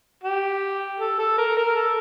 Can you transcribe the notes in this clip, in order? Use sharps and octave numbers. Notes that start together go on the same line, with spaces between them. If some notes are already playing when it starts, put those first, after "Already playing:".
G4
A4
A4
A#4
A#4
A4